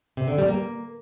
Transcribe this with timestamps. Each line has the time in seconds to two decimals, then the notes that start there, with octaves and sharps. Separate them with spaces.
0.17 C3
0.28 D3
0.38 G3
0.49 A#3